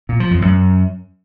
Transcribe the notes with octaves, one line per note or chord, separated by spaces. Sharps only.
A#2
F3
F2
F#2